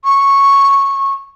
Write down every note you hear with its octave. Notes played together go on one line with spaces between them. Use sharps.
C#6